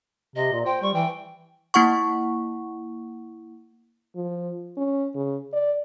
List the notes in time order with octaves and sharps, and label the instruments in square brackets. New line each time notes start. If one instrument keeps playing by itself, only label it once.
[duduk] C3 [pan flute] D#5
[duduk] A#2
[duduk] C5 [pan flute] G5
[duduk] G3 [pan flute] C#6
[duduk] E3 [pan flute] G5
[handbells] A#3 E4 F#5 C#6
[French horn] F3
C#4
C#3
D5